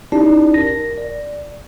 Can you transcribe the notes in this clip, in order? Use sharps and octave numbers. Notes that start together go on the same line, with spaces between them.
C#4 D#4 E4 G4 D5 A5
A#4 A#6
D5